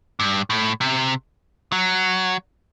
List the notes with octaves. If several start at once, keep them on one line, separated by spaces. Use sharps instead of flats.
G2
A2
C3
F#3